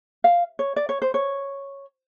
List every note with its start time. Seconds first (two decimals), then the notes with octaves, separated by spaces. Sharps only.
0.24 F5
0.59 C#5
0.76 D5
0.89 C#5
1.02 C5
1.14 C#5